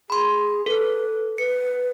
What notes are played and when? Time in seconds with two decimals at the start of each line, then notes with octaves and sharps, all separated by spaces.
0.10 G#4 B5 C6
0.66 A4 B4
1.38 B4 C#7